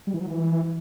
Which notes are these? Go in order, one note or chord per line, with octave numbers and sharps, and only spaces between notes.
G3
E3
F#3
E3